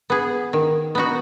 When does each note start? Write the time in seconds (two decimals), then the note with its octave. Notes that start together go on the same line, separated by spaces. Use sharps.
0.10 B3 G#4
0.53 D#3
0.95 B3 D#4 F#4